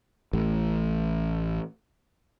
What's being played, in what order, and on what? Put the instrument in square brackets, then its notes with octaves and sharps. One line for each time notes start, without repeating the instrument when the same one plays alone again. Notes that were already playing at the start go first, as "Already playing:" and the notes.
[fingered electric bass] A1 A2